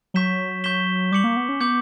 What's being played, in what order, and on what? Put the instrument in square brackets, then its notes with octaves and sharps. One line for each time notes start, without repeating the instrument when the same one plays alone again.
[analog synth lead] F#3 [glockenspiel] C#6 G6 B6 E7 G7
[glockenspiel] C#6 G6 B6 E7 G7
[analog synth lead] G3 [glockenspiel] D6 G6 C#7 F#7
[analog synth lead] A#3
B3
C#4
[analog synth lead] B3 [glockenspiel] D6 G6 C#7 F#7